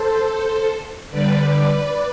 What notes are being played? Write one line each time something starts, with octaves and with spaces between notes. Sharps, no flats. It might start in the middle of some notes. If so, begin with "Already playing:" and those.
Already playing: A4 C5
D3 G3 B4 D5